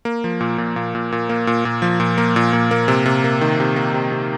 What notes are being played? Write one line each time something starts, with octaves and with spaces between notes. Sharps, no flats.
A#3
F3
A#2
A#2
A#2
A#2
A#2
A#3
A#2
A#2
F3
A#2
A#3
A#2
A#2
A#3
C3
C3
A#3
D#3
C3
A#3
C3
C3